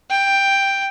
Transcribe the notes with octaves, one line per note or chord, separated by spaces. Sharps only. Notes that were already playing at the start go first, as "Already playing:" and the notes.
G5